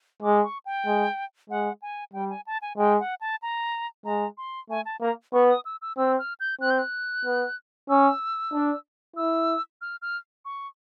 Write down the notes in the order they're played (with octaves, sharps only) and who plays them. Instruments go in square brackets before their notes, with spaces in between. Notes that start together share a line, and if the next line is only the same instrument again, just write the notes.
[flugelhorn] G#3 [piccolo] D6
[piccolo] C#6
G5
[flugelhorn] G#3
[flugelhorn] G#3 [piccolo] F#5
[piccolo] G#5
[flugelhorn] G3 [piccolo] G5
[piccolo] G#5
A5
G#5
[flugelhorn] G#3 [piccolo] G5
[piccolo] F#5
A5
A#5
[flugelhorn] G#3 [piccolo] A#5
[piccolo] C6
[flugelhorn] A3 [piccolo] G#5
[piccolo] A5
[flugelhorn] A#3 [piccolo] A#5
[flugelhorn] B3 [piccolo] C#6
[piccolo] D#6
E6
E6
[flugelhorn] C4 [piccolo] E6
[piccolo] F6
G6
[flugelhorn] C4 [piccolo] F#6
[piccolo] G6
F#6
[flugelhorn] B3
[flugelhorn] C#4 [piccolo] E6
[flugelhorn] D4
[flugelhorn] E4 [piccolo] E6
[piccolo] F6
F6
C#6